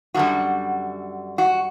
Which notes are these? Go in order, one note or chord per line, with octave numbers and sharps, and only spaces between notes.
F#2 D3 G3 F#4
F#4